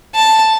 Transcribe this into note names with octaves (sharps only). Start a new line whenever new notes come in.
A5